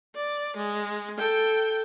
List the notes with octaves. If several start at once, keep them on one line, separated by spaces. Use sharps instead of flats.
D5
G#3
A4 G5